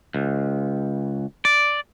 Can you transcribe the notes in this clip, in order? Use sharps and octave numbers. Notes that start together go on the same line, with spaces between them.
C#2
D5